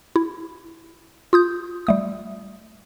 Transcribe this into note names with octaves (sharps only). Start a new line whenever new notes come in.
E4
F4 D#6 G6
G3 A3 D#6